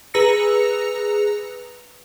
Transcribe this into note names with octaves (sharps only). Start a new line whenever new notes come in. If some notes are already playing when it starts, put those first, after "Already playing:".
G#4 B4 A#5 E6 A#6 C#7